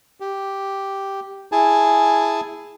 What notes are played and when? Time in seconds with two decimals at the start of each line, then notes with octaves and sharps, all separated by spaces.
0.20 G4
1.52 E4 G#4 G#5 A5